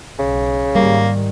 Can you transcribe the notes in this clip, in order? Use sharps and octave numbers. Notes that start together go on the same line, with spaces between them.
B1 C#3
G#2 D#3 G3 A#3